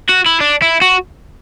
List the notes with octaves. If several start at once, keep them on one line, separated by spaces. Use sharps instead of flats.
F#4
E4
D4
E4
F#4